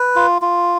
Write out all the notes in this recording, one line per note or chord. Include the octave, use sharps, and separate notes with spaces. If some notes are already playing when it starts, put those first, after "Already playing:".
Already playing: B4
F4
F4